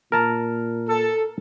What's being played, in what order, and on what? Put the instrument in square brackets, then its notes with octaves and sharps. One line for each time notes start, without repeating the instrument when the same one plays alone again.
[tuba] A#2 [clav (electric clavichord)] A#4 A5 A#5
[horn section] A4